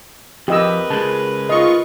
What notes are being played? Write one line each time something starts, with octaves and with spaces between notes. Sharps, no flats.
F2 G4 A#4 B4 D#5 E6
C#3 G#3 A5
F4 D#5 C#6